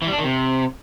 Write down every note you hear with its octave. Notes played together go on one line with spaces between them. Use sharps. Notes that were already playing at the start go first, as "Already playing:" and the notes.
E3
G3
D4
D#3
C3